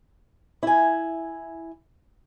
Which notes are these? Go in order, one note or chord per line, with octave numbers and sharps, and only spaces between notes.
E4 G#5